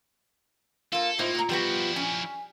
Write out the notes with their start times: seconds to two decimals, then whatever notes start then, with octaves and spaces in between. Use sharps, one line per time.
0.92 A#3 F4 A4
1.19 A2 A#3 D#4 F4 C5
1.35 A#2 A#5
1.49 F3 G3 B3 E4 F#4
1.96 C#4 G#5